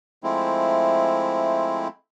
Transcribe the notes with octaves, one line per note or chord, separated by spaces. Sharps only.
F3 G#3 A3 C4 E4